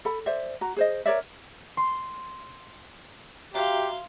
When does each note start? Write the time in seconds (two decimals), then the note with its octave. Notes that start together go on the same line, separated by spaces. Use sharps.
0.05 A4 B5
0.26 C5 D5 E5
0.61 F#4 A#5
0.76 G#4 C5 D#5
1.06 A#4 C#5 D5 E5
1.77 C6
3.54 F#4 G4 E5 F5 A#5 C6